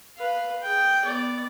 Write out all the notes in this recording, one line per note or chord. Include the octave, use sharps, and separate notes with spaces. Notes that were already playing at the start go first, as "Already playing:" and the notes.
B4 F5
G#4 G5
B3 D5